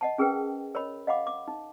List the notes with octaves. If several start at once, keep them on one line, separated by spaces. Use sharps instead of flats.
D#5 F#5 A5
C#4 G#4 A#4 B4 G5
A#4 C#5 D#5 B5
D#5 F5 F#5 B5 D6
D6
D#4